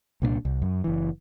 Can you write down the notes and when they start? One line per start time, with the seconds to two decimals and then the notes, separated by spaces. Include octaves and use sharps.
0.22 C2 A#2 C4 D4
0.45 C2
0.62 F#2
0.84 F#1 E3